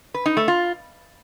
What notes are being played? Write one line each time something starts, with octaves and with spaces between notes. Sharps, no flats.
B4
D#4
A3
F4